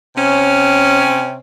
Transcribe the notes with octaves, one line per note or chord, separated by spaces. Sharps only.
C3 C4 C#4